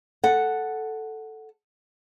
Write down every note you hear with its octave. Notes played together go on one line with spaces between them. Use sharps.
A4 F#5